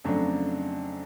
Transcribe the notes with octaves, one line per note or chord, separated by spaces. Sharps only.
F2 C#3 F#3 A3 D4